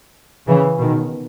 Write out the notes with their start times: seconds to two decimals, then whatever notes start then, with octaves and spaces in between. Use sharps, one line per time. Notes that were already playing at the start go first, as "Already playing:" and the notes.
0.47 C#3 E3
0.80 B2 D#3